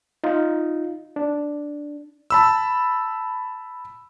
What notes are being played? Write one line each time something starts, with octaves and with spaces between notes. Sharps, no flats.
D#4 F4
D4
A5 B5 E6